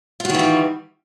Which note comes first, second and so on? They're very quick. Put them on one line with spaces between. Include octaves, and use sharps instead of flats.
F4 F#4 D#3 E3 G3